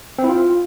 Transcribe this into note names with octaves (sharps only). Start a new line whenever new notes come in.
C4
E4
F4